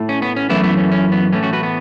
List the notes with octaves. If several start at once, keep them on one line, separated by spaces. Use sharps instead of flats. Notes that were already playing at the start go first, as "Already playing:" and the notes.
Already playing: A2 A3
C#4
B3
C#4
F#2 E3 A3 B3 E4
B3
C#4
C#4
B3
A2 E3 A3 C#4
C#4 F#4
F#4 B4
B3